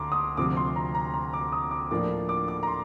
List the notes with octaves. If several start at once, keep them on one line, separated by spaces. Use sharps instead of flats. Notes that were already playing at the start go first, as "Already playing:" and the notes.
Already playing: D2 A#5 C6 D6
D#6
D2 C3 F3 C4 D6
C6
A#5
A#5
A#5
D6
D#6
D6
A2 F3 A#3 D4 D6
D6
D6
A#5
C6